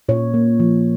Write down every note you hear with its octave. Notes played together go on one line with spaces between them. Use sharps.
A#2 C#5
A#3
F3